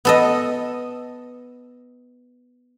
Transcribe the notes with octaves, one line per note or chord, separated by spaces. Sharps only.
B3 A4 D#5